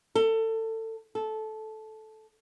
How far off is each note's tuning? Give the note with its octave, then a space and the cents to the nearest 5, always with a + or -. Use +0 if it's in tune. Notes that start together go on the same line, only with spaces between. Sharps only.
A4 +25
A4 -15